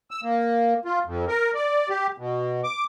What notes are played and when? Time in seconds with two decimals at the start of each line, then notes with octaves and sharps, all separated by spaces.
0.11 E6
0.23 A#3
0.85 F4
1.05 F2
1.28 A#4
1.55 D5
1.89 G4
2.18 B2
2.64 D6